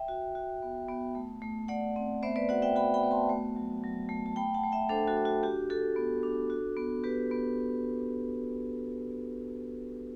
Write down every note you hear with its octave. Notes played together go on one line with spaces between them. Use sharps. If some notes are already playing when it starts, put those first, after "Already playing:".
Already playing: E5 G5
F#4
F#4
B3
B3
A3
A3
A3 D5 F#5
C4
B3 C5 E5
B4 D5
F#4 D5 F#5
E5 G5
F#4 G5 B5
G5 B5
B3
A5 C6
A3
F#3
F#3
A3
A5
A3 G5 B5
F#5 A5
A3
E5 G5
D4 A4 C5
F#4 A4
D4
F#4
F#4 G4
F#4 A4
B3
D4
F#4
B3
B3 G4 B4
B3